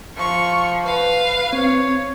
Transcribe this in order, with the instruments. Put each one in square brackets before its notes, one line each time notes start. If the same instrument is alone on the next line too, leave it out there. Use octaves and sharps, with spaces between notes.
[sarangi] F3 [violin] C#6
[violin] B4 F5
[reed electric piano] C4 [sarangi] C#5